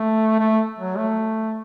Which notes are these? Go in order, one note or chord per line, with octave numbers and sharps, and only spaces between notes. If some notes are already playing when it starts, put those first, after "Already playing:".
Already playing: A3
A3
F#3
A3